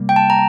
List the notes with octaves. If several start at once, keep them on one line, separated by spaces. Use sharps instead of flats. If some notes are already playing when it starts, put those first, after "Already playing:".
Already playing: C3 G3 A#3
G5
A5
A#5